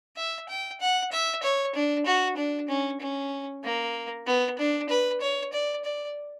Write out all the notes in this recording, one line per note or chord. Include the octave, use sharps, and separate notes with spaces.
E5
G5
F#5
E5
C#5
D4
F#4
D4
C#4
C#4
A#3
B3
D4
B4
C#5
D5
D5